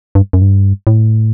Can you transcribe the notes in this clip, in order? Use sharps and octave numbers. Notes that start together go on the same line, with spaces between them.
G2
F#2
G2
A2